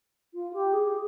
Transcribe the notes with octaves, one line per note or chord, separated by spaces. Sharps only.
F4
G4
G#4